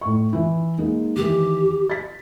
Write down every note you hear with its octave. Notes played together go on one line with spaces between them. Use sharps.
A2 C#6
E3 E4
G#3 A#3 D#4
D#3 E3 G4
A6 B6